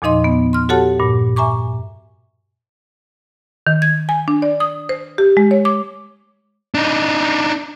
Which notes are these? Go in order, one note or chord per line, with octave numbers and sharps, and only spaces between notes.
E2 A#2 F3 D#4 D#5 C6
B3
C6 F6
F#4 G4 A4 C#5 F#5 A5
G2 A#2
E5 G#5 A#5 C#6 D6
D#3
G#6
G#5
D4
D5
D#6
C5
G4
G#3
C#5
D6
D4 D#4